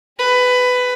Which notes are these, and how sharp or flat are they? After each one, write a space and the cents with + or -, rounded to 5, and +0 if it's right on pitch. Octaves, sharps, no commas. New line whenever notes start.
G#4 -25 B4 +15